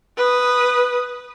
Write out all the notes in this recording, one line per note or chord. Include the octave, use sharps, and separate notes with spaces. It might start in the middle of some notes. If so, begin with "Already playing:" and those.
B4 D#6